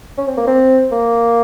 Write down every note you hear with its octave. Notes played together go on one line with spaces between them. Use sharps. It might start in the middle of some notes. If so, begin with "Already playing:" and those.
C#4
C4
A#3
C4
A#3